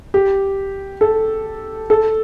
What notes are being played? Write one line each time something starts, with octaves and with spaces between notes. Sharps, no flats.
G4
A4
A4